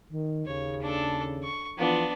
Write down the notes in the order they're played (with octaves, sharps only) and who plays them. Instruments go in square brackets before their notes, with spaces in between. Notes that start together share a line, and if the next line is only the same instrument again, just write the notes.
[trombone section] D#3
[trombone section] D#2 C#3 [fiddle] C#5
[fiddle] D4 A4
C#6
[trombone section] E3 F3 F4 [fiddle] B3 D4